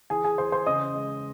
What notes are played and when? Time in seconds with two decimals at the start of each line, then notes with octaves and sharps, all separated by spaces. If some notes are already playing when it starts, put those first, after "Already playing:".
0.10 E3 G#4 G#5
0.24 G#4 G#5
0.38 E3 C5 C6
0.52 C5 C6
0.66 C#3 D#5 D#6
0.94 G#3